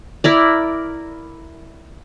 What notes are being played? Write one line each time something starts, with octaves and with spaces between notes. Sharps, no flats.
E4 A#4 D5